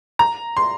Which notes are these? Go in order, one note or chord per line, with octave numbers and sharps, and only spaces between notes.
A#5
C6